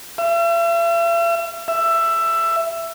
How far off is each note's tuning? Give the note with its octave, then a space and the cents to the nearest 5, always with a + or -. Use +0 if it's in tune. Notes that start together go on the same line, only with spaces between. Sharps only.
E5 +45
E5 +15